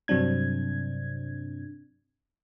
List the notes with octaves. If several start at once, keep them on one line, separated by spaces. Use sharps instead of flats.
G2 C3 F#3 C4 D4 G#6